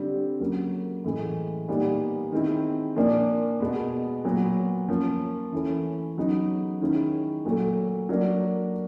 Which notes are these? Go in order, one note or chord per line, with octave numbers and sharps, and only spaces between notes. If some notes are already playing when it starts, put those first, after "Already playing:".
Already playing: D3 G3 C4
C#3 F#3 A#3
A2 E3 G#3
A#2 G3 B3 D#4
D#3 G#3 C4 E4
A#2 F3 A#3 D4
B2 G#3 B3
A#2 F#3 B3
F3 A#3 C#4
E3 A3 C#4 E4
C#3 F#3 B3 D#4
D#3 G#3 C#4 E4
A#2 F#3 A3
F#3 A#3 D4